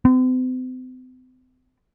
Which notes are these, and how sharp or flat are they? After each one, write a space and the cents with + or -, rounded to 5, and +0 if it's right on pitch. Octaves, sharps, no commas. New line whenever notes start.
C4 -45